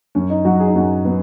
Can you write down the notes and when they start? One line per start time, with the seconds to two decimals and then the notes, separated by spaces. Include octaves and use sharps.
0.15 F#2 C#4
0.30 D#4
0.45 F#3 F#4
0.60 G#4
0.68 D#4
0.76 F#2 F#4
1.05 F#3 B3